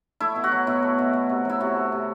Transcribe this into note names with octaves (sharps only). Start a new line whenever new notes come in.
A3 E4
B2
F#4
F#3
B2 E4
A3
B2
A3
C3
F#3 E4
C3 F#4
A3
C3